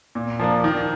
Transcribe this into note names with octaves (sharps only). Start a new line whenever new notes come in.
A#2
F3 A#3 D4
D#3